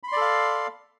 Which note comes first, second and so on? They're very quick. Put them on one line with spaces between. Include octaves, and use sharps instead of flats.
B5 C6 D5 A4 F5